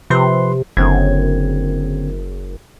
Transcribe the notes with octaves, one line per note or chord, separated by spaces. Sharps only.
C3 F3 B4 C6
F#1 D3 C4 G#6